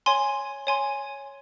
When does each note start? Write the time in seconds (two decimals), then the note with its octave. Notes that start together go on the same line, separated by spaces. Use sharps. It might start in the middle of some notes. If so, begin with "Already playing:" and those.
0.06 C#5 G#5 C6
0.67 C#5 G#5 C6